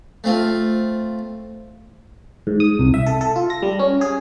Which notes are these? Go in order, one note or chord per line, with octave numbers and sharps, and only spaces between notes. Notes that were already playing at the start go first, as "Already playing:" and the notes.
A3 C4 F4
G#2
D#6
C2
E5
A4
A4
F4
A#6
G3
C#4
G#4